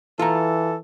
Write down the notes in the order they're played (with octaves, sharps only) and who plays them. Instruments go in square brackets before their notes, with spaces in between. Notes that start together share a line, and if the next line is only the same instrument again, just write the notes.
[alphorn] E3 [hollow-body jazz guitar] F4 A#5 [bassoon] A4